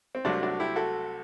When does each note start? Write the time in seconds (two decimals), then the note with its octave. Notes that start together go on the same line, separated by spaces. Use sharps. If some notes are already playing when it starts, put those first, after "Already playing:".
0.15 C4
0.25 C2 C3 F#3 A3 D4
0.43 D4 F#4
0.60 E4 G4
0.76 F#4 A4